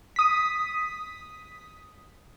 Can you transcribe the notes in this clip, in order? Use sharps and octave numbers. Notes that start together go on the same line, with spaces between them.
D#6 B6